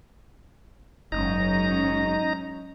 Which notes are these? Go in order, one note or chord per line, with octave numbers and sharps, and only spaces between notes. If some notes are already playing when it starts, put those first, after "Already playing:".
F#1 G#2 F#3 C#4 D#4 A#5